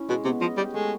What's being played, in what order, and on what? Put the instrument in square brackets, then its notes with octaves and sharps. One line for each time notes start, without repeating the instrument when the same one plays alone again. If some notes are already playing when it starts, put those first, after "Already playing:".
Already playing: [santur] C#4 E4
[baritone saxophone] B2 [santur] G#3
[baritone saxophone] C3 [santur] B3
[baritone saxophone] F3 [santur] D#5
[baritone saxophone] G3 [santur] G4
[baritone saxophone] G#3 [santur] A3